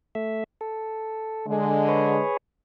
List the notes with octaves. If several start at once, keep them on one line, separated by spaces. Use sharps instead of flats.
A3 E5
A4
D3 G#3
G#4 B4 C#5